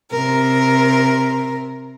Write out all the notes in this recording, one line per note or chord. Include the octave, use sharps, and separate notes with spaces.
C3 A#4